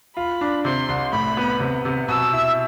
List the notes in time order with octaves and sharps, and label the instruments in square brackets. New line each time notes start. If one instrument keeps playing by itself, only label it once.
[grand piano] F4 [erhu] B5
[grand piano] D4
[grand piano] C3 [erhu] C6
[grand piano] C2
[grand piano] A2 [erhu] B5
[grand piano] B3
C3
C3
[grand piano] B2 [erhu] E6
[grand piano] E4